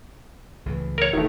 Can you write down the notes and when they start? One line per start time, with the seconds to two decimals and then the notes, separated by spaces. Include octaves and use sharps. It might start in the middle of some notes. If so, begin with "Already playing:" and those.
0.66 C#2 A2 E3
0.98 A#4 C#5
1.13 E1 D#3 A3